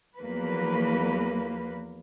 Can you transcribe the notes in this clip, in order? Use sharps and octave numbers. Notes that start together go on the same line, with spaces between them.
E2 F3 F#3 A#3 B4